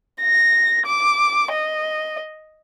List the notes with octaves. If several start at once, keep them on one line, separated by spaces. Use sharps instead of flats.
A#6
D6
D#5